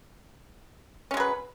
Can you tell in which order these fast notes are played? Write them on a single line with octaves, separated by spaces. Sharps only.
C#4 G#3 F#3 B4